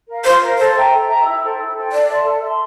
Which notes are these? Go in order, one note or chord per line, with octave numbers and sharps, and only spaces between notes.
A#4 F5
F4 C5
A#4 F5
A4 C5
E5 G5 A#5
A4
E5 G5 A#5
E4
A4 C5 G5
E4
A4 C5 G5
A4 D5
E5 A5 C6
A4
E5 A5 C6